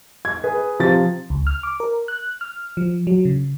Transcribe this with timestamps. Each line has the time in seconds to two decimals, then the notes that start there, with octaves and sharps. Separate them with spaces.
0.25 G#6
0.44 G#4 B4
0.80 C3 F3 A6
1.30 C#2
1.47 F6
1.63 D6
1.80 A#4
2.08 F#6
2.41 F6
2.77 F3
3.07 F#3
3.25 C#3